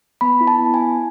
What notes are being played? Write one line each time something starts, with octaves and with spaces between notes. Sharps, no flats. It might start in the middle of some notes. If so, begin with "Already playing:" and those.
B3 B5
E4
A5
B3
G#5
E4